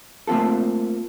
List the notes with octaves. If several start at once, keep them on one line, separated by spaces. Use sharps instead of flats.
A3 A#3 C4 F4 A4